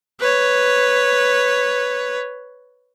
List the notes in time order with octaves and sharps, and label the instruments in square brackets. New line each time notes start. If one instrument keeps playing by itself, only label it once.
[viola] B4 C#5